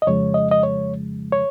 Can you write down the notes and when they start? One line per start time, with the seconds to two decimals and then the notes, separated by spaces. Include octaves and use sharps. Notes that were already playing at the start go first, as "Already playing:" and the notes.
0.02 D#5
0.07 F2 C#3 F3 G#3 C#5
0.34 D#5
0.51 D#5
0.63 C#5
1.32 C#5